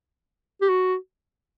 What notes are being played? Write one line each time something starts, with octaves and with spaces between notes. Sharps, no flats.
G4
F#4